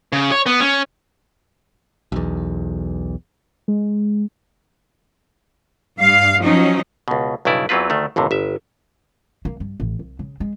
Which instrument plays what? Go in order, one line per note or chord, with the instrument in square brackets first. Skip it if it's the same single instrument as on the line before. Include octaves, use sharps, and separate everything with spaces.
[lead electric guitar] C#3
C#5
B3
C#4
[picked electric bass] B1 E2
[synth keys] G#3
[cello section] G2 F5
F3 F#3 C#4 D#4
[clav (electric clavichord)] C#2 B2
B1 G2 C#3 E4 D5
E2 E3 F#3 C4 F4 B4
D2 D#3 A3
G1 D#2 A2 C3
G1 E5
[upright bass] A#3
G2
A1
C2
C#3
G#3